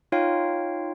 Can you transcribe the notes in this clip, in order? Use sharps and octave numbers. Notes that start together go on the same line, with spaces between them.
D#4 F4 C#5 F5 G5